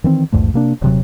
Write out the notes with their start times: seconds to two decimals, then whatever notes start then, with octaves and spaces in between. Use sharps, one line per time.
0.04 D#3 E3 C4
0.32 A#1 E2 G#2 A3
0.54 C3 A#3 D4
0.82 D#1 C3 F#3